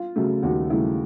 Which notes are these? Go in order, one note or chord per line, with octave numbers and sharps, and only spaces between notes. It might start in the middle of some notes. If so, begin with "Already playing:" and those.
Already playing: F4
C#3 F#3 A3
D#2 F#4
C#3 F#3 A3 E4